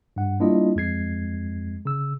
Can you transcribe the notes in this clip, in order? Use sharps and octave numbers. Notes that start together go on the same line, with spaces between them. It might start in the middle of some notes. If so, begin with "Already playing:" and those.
G2 F#5
G3 A#3 D4 E4 F4 D#5
F2 G#3 G#6 C7
C#3 E6